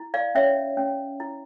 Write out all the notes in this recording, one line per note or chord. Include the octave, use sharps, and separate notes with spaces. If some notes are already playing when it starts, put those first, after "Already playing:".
Already playing: E4
D5 F5
C#4 C#5 E5
C#4
E4